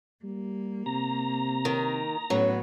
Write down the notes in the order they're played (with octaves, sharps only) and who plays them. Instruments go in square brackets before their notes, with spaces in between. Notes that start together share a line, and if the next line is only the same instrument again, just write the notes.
[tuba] G3 [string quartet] A#3
[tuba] C3 [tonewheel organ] A#5
[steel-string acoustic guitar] D#3
[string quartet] A2 B3 [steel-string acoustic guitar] F#3 [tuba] C#4